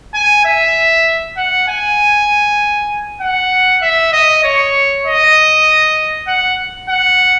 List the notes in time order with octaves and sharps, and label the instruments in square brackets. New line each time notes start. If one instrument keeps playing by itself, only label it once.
[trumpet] G#5
E5
F#5
G#5
F#5
E5
D#5
C#5
D#5
F#5
F#5